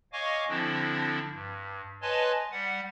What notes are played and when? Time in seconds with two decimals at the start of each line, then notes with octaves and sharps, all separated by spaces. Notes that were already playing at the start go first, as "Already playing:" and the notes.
0.13 C#5 D#5 F5 G#5 C#6 D6
0.49 D3 F3 C4 D4 E4
1.32 G2
2.02 B4 C#5 D#5 G#5 A5 C6
2.51 G3 F#5